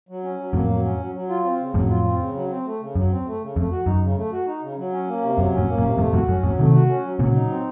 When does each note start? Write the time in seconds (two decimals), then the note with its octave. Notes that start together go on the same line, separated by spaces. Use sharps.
0.09 F#3
0.23 C#4
0.39 F#3
0.53 F2 A2 A#3
0.69 F#3
0.84 C#4
0.99 F#3
1.15 F#3
1.29 F4
1.45 C4
1.59 C#3
1.74 F2 A2 F#3
1.89 F4
2.05 C4
2.20 C#3
2.35 F#3
2.50 C4
2.65 A3
2.80 C#3
2.95 F#2 F#3
3.11 C4
3.27 A3
3.41 C#3
3.56 F2 A3
3.71 F#4
3.86 F#2 D#4
4.02 C#3
4.17 A3
4.32 F#4
4.47 D#4
4.62 C#3
4.77 F#3
4.92 C#4
5.08 A#3
5.22 C3
5.37 F#2 F#3
5.52 C#4
5.57 F2 A2
5.68 A#3
5.78 F#2 A#2
5.82 C3
5.98 F2 A2 A3
6.13 F2 A2 F#4
6.28 F#2 C#4
6.43 F2 A2 F#3
6.59 C3 D#3 A3
6.74 F#4
6.89 C#4
7.04 F#3
7.19 A#2 C#3 F#3
7.34 D#4
7.49 C4